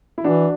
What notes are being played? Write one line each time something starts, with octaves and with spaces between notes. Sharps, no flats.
E4
E3 D4 F#4